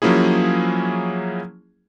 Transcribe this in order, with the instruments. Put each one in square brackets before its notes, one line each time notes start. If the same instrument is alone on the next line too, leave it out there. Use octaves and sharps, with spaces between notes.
[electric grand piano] F3 F#3 A#3 C#4 E4 G#4